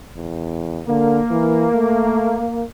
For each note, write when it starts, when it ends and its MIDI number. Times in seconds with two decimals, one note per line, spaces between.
0.17 0.82 40
0.88 1.20 50
0.88 2.62 58
1.31 1.68 52
1.74 2.39 57